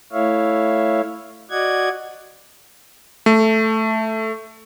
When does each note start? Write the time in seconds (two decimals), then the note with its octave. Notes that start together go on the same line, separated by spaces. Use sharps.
0.12 A3 E4 C#5 E5 F5
1.51 F#4 D5 D#5 F#5 G#6
3.26 A3